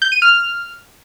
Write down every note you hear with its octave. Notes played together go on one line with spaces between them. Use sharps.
G6
D#7
F6